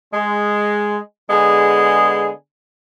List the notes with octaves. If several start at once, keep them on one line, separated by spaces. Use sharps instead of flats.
G#3
D3 G#3 B3 G#4